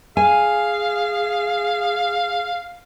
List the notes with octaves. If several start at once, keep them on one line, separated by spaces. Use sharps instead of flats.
G#4 F5 G#5